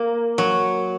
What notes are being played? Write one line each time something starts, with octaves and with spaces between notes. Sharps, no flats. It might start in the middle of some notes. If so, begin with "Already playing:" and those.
Already playing: A#3
F#3